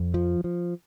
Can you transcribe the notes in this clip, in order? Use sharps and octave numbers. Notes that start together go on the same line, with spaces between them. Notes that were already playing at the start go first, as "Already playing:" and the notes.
Already playing: F2
F3
F3